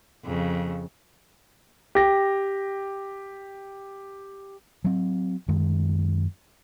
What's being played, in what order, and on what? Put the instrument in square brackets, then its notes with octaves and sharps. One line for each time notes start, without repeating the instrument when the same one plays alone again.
[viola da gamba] F2 C#3
[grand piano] G4 G5 A#6
[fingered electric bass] F#3 C4
F#2 D#3 G#3